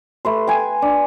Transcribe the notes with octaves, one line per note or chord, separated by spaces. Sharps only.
A3 B4 C6
G5 G#5
D4